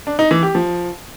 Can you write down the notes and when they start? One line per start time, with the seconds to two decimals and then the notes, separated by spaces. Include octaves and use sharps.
0.07 D4
0.19 D#4
0.31 E3
0.43 G4
0.55 F3